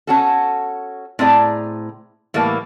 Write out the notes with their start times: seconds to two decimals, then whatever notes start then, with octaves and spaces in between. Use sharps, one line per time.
0.07 C#4 F#4 A4
1.19 A2 C4 G#4 D5 A#5
2.34 A2 E3 G3 A#3